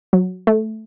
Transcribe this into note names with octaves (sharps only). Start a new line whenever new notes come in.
F#3
A3